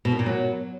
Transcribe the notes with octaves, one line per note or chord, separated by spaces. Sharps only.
B2
D#3
A#2
F#3